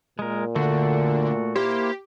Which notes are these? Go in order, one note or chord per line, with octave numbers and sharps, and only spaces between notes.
A#2 G#3 A#4
D3 A3 F#4
A#3 E4 G4 C5